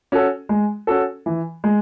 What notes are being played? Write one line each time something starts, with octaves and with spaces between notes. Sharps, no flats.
C#4 F#4 A4
G#3
C#4 F#4 A4
E3
G#3